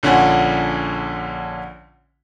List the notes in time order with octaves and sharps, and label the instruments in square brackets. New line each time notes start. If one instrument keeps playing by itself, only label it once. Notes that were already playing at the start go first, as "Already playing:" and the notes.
[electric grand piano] A#1 D3 C#4 F4 F#5 G#5